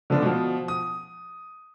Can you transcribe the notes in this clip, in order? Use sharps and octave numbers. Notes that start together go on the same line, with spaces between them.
D3 F3 B3 D4
B2 F3
D#6